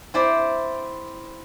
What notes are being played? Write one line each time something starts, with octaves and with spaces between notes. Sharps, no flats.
C4 E4 C5 D5